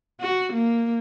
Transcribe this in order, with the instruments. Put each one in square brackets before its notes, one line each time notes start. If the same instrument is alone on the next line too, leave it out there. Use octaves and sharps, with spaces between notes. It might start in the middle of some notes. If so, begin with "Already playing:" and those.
[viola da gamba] F#4
A#3